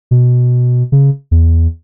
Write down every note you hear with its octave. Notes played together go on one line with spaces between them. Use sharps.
B2
C#3
E2